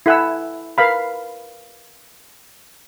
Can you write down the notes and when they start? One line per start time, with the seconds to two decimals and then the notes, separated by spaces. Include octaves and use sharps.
0.06 E4 A4 F#5 G#5 E6
0.78 A#4 B4 F5 B5